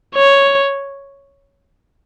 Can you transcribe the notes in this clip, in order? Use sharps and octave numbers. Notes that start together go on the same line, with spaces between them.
C#5